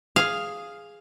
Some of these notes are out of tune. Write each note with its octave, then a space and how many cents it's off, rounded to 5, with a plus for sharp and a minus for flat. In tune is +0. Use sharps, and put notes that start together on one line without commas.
G#4 +0 F5 +0